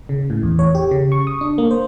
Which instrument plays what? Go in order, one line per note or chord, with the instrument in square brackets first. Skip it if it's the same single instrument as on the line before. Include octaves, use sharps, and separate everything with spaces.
[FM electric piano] C#3
A2
E2
C#5
G4
C#3
C#6
D#6
D4
A#3
C5